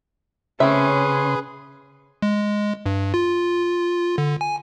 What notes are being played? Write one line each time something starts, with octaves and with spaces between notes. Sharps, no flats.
C#3 A3 C4 C#4 G#4 B4 E5 C6
G#3
G2
F4
D3
G#5